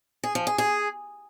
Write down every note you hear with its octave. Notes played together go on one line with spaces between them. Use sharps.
G#4
F3
G#4
G#4